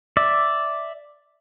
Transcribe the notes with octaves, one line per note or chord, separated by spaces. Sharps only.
D5 E5